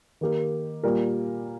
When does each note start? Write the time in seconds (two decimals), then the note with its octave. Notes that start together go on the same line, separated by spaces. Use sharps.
0.21 D#3 A#3 G4 A#4
0.83 A#2 G3 A#3 G4 A#4